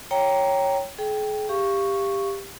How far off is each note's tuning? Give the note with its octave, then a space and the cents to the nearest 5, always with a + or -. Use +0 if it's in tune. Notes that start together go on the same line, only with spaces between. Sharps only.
C#5 +0 G5 -5 A#5 +0
G#4 +40 G5 +0
G4 +15 F5 -20 C#6 +0